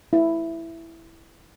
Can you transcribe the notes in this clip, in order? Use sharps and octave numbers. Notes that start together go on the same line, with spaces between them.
E4